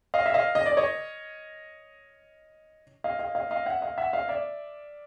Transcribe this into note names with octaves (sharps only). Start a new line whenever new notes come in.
D#5 F5
E5
D#5 F5
D#5
D5
C#5 D#5
D#5 F5
D#5 F5
D#5 F5
D#5 F5
E5 F#5
D#5 F5
E5 F#5
D#5 F5
D5 E5